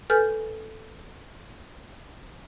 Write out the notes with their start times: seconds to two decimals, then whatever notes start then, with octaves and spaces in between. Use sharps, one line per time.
0.10 A4 B4 G#5 F6 G6